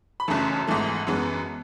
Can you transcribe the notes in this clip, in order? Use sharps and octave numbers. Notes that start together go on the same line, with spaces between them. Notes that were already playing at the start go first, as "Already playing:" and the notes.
B5
F#1 F#2 C#3 E3 A3 A5
G#1 G#2 E3 A3
F#2 E3 G#3 B3